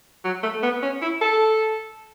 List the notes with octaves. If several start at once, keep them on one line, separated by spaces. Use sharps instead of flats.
F#3
A3
B3
C#4
E4
A4